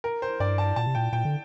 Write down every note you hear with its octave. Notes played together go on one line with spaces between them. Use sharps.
A#4
C5
G2 D5
A5
A#2 A5
C3
A#2 G5
A#2 G5
D3